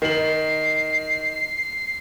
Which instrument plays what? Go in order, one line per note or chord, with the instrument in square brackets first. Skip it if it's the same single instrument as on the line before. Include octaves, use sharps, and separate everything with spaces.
[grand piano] D#3 F#7 [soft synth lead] C7